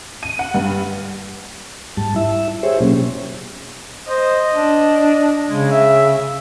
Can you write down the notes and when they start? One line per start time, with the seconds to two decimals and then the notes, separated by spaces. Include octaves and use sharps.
0.23 D#7
0.39 F#5
0.54 G2
1.97 G#2 G3 A5
2.16 E4 E5
2.63 G4 G#4 C5 C#5 E5
2.80 B2 F#3 A#3 C#4
4.08 C5 D#5
4.54 D4
5.49 C#3 G#3
5.71 E5